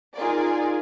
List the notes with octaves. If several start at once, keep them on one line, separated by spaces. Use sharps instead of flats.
D#4 F4 G#4 A#4 D5